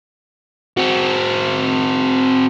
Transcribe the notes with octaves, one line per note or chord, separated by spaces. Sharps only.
C4 F#4